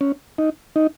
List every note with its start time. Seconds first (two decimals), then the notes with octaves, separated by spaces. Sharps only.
0.01 C#4
0.38 D#4
0.76 D#4